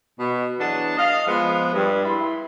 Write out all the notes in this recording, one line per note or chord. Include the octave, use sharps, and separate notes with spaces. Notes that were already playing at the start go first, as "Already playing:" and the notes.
B2
E3 F#3 B3 D4 G#4 A5
D#5 F5
F3 G#3 B3
G2
E4 B5 C6